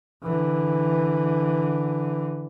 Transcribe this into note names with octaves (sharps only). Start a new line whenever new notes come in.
D3 E3